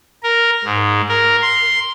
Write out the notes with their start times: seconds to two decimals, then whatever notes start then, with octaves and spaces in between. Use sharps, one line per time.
0.23 A#4
0.64 G#2
1.09 A#4
1.42 C6